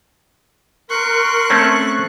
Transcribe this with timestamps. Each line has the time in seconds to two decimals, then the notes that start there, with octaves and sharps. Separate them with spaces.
0.90 A#4 C6 C#6 F#6
1.50 A3 C4 C#4